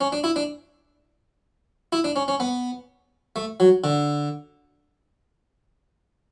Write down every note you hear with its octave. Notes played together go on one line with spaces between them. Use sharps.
C#4
D4
E4
D4
E4
D4
C#4
C#4
B3
A3
F#3
D3